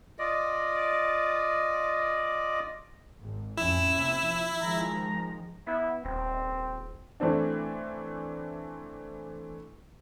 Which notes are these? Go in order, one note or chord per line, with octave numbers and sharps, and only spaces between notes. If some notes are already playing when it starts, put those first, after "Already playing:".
F4 D5 D#5
G#1
A1 F2 C#4 E4 E7
D#2 C3
F3
D#3 F3 G#3 A#5
B3 E4
D#1 C4
E3 A3 C4 D4